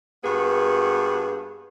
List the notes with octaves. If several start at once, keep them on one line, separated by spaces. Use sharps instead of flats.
G2 A#3 B3 F#4 G#4